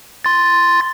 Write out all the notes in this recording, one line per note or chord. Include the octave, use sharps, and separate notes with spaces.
C6 A6